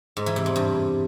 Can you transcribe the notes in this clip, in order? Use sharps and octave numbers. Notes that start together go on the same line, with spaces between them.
G#2
E3
C3
E2
G2